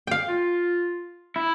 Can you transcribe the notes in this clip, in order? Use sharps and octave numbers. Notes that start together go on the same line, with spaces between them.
F5 G5
F4
E4